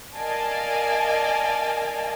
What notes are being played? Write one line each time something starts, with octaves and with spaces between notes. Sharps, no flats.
A#4 D5 D#5 F5 G#5 A5